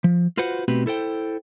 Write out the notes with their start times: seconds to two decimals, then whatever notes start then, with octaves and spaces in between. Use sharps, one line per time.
0.04 F3
0.37 F4 F#4 B4 C5 F#5
0.68 B2 A3 C4 F#4 G4 B4
0.86 E4 A4 C5 G5